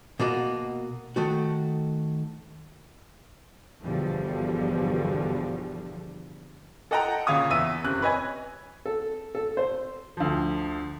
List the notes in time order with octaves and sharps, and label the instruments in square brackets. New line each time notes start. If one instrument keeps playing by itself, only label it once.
[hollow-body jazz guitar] B2 A#3 F#4 D#5
D#3 A3 F#4
[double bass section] G1 E2 B2 D3 F3 G3
[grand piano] A4 D#5 F#5 G5 A#5
A#2 C#3 F4 C#5 D#6
E2 E5 E6 D#7
F#1 C3 F#6
B4 C#5 D#5 G#5 G#6
[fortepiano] A4
A4
C5
[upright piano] D2 F3